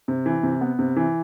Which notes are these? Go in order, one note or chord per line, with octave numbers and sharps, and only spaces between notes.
C3
E3
C3
B3
C3
E3